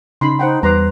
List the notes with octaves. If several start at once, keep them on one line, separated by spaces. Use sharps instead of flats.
C#3 D#4 B5 C6
D#4 C5 F#5 G5
E2 G3 B4 A#5 C6 D6